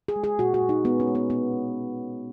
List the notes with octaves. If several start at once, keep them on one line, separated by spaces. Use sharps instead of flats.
G#4
G#3
G#4
A#2 F#4
F#4
A#2
D#4
G#3 B3
C#4
G#3
B3
B2 B3
B2